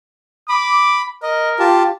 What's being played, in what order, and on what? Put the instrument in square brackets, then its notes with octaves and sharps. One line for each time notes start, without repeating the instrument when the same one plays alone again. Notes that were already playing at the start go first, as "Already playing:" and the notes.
[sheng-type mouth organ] B5 [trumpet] D6
[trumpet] A#4 [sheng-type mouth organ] D#5
[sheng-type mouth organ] F4 G4 A5